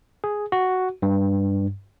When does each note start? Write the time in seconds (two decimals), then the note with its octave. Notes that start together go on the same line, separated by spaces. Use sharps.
0.24 G#4
0.52 F#4
1.02 G2